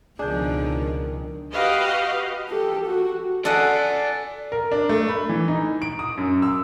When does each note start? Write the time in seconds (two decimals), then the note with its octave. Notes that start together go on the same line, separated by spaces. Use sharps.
0.19 C#2 B2 D3 D#3 F3 D4 G#4 G6
1.53 F#4 G4 B4 D#5 F5
2.49 G4 A4
2.87 F#4
3.45 A4 D5 D#5 F#5 G#5
4.52 A#4
4.72 D4
4.89 A3
5.08 B5
5.29 E3
5.48 D#4
5.82 D7
5.99 D#6
6.17 F#2
6.42 E6